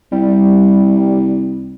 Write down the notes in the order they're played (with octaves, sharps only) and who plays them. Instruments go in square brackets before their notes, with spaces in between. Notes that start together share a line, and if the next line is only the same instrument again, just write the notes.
[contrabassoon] C2 [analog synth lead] G3